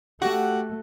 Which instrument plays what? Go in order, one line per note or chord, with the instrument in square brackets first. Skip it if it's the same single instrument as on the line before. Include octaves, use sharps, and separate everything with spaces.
[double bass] A3 [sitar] F#4 [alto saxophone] G4 [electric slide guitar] F#5